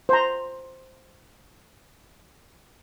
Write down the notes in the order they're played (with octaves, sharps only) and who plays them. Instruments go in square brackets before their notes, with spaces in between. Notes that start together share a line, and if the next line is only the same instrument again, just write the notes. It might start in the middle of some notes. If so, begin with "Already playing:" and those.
[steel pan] C5 A#5